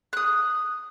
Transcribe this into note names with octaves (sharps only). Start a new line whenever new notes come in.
D#6 F#6